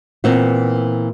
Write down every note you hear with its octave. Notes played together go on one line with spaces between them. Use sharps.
A#2 E3 B3 C4